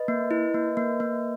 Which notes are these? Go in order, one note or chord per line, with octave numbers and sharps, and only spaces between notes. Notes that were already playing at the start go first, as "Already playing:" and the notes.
Already playing: B4 D#5
A#3
E4
A#3
A#3
A#3